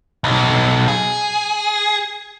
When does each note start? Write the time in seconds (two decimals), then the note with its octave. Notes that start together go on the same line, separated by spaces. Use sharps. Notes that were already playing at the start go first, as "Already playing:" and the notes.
0.24 B1
0.88 G#4